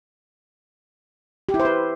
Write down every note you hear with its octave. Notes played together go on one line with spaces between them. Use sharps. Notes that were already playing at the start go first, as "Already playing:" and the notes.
G4
E4
C5
B4